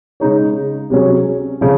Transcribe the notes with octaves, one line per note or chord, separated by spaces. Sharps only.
C#3 G#3 D#4 G#4 C#5
C3 F#3 C#4 G#4
C#3 F3